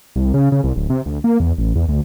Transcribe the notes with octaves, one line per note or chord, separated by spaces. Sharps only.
C2
C#3
C#3
C2
D1
C3
D2
A#3
E2
A1
E2
D2